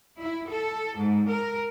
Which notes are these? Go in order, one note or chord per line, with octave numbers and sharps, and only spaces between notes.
E4
A4
G#2
A#4